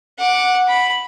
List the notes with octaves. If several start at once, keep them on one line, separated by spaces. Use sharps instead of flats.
F#5 D6
B5